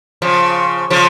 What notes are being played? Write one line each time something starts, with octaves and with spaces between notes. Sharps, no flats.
C#3 F3
C#3 F3